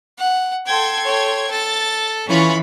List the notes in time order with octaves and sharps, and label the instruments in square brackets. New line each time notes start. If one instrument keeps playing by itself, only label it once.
[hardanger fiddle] F#5
[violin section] A4 C6 G#6 [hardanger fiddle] G5
[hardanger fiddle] C#5 G5
[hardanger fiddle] A4 [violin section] A6
[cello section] E3 [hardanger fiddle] C#4 F4 [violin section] B5 C#6